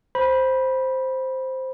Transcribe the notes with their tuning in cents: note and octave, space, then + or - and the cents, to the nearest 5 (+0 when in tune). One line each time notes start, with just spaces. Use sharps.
C5 +0 B5 -20